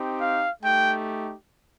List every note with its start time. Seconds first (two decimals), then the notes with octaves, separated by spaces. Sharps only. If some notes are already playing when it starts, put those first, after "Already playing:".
Already playing: C4 D#4 G4
0.20 F5
0.63 A3 D#4 G4 G5